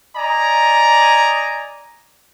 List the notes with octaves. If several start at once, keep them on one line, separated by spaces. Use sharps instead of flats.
D5 D#5 G#5 A#5